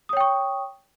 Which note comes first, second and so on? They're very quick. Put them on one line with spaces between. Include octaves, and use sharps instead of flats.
D#6 C#5 G5 C#6